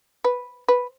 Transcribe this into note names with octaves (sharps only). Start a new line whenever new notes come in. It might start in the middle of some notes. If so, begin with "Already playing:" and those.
B4
B4